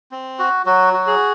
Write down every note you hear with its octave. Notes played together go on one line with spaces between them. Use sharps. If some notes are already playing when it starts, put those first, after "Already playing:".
C4
F#4
F#3 F#4
F#4
G#4